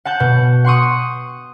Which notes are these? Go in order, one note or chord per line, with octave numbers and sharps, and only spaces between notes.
F#5 A5 G6
B2
F#5 C6 C#6 D#6